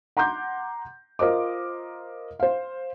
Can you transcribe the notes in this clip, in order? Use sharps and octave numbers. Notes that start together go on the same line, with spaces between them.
F#5 A#5 C6 D6 G6
F4 A#4 C5 D#5 D6
C5 F5